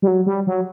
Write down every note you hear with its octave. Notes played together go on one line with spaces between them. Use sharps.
G3
F#3
G3
F#3